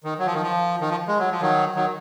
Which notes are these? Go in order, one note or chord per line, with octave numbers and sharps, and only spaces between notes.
D#3
F#3
F3
D#3
F3
D#3
F3
G#3
F#3
F3
D#3 F#3
D#3 F#3